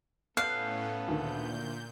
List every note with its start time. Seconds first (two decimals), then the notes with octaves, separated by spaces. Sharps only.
0.37 A2 B3 C#4 A4 F5 F#6 G6
1.08 D2 A#2 D#3 G6